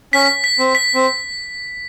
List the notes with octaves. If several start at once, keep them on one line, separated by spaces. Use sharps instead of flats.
C#4 B6
B6
C4
B6
C4